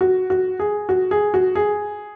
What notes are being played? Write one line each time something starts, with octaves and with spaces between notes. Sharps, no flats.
F#4
F#4
G#4
F#4
G#4
F#4
G#4